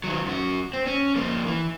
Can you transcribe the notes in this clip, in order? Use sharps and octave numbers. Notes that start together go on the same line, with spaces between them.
D#3 F#3
F#2 F#4
C4
C#4
F2 A#3
E3